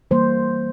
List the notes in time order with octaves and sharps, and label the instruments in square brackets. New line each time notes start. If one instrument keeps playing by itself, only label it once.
[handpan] E3 G3 A#3 C5